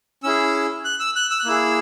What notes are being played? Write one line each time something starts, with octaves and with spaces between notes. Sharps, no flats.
C#4 E4 G#4 E6
F#6
E6
F#6
E6
F#6
A#3 E4 G#4 E6